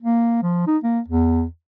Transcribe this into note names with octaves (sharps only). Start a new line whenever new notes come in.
A#3
F3
D#4
A#3
E2